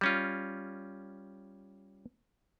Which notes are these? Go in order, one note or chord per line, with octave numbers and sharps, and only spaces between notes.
G3 C#4 F4